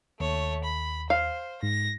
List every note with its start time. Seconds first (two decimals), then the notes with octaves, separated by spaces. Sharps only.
0.20 D#2 A3 C#5
0.65 B5
1.10 C5 F5
1.63 G#2 A#6